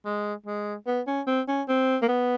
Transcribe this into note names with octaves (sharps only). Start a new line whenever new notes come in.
G#3
G#3
B3
C#4
C4
C#4
C4
A#3
B3